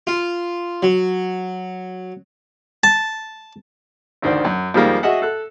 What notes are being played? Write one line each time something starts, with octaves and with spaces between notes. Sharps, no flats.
F4
F#3
A5
A1 D2 D#3 C5 D5
F#2
F2 D#3 F3 G3 G#3 A#3
F#4 G#4 D#5 E5 F#5
A4 F#6